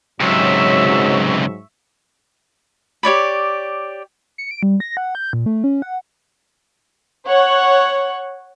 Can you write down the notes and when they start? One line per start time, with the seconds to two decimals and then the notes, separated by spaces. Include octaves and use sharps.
0.20 C#2 G#2 C3 F#3 E5 C#6
3.03 G4 C#5 D5 B5
4.38 C#7
4.51 D7
4.63 G3
4.80 A#6
4.97 F#5
5.15 G6
5.33 A#2
5.46 A3
5.64 C#4
5.82 F#5
7.27 C#5 F#5